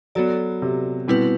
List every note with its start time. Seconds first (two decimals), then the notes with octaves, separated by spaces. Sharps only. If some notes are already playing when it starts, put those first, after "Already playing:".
0.15 F#3 B3 F#4 A4 D5
0.62 C3
1.08 B2 G3 C4 E4 B4